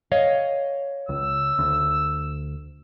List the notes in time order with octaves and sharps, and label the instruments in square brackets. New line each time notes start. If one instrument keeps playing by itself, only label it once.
[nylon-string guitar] C#5 D#5 F5
[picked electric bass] C#2 [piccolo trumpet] E6
[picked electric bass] D2